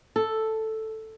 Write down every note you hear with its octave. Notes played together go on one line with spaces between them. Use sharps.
A4